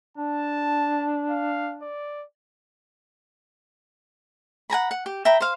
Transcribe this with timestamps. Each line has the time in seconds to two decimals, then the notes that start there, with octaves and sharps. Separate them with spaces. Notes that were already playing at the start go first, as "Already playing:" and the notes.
0.17 D4 A5
1.30 F5
1.82 D5
4.70 F#5 G#5 A#5 B5
4.91 F#5
5.06 G4
5.25 E5 G5 A#5 B5
5.40 C5 F5